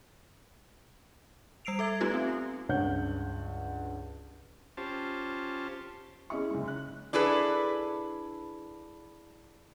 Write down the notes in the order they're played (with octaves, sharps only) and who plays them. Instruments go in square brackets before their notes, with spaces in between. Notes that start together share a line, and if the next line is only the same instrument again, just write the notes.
[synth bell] G3 E6 C7 D7 F7
A4 E5 G#6
A3 B3 D#4 F4 G4 B4
C4
[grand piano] C#2 G2 C#5 F#5 G6
[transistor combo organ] C#4 F4 G4 C5 A5
[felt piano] C#4 E4 G#4 D#5 E5 C#6
F#1 G#2
F#6
[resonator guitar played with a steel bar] D4 E4 G#4 A4 B4